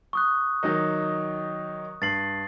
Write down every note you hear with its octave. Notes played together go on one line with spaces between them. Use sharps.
C#6 D#6 F#6
D#3 F#3 D#4
G2 A6 C7 F#7